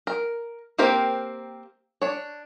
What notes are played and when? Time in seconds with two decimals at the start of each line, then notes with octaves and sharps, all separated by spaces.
0.07 A#4
0.79 A#3 C4 G4 A#4 C5
2.02 D4 C#5